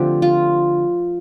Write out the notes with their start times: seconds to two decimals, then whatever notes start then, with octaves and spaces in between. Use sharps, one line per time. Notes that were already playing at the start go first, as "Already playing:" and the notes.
Already playing: D3 F3 A3 C4 G4
0.22 F4